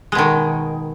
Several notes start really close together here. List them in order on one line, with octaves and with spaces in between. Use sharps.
G#3 B2 D#3